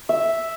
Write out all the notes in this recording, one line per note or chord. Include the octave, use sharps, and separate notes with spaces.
E5